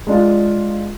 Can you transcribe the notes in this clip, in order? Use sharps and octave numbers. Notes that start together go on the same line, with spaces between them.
G#3 D4 F4